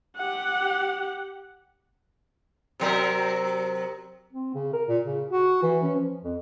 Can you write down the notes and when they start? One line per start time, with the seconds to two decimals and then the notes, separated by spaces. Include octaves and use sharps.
0.17 G4 F#5
2.80 C3 F#3 A#4
4.33 C4
4.54 C#3
4.73 A#4
4.88 A#2
5.03 C#3
5.31 F#4
5.62 E3
5.83 C#4
5.95 F3
6.23 F2